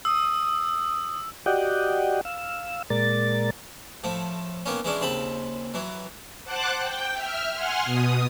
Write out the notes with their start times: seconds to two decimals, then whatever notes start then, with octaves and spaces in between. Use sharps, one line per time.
0.05 D#6 E6
1.46 F#4 G4 D5 D#5 F#5 G5
2.25 F5 E6
2.90 A#2 G#3 A#4 D5 A6
4.04 A2 F3 A3
4.66 D#3 A#3 B3 C#4
4.84 E3 G#3 C#4 D4
5.01 D#2 C#3 C4 A5 B5
5.74 E3 F#3
6.44 C5 F#5 A5 D6 F#6
6.79 G5 G6
7.14 E5 F6
7.53 F#5 G#5 C6 F6
7.85 B2 D#6